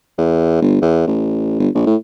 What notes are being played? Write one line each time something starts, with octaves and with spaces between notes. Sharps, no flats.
E2
G1
E2
A1
G1
A#1
A2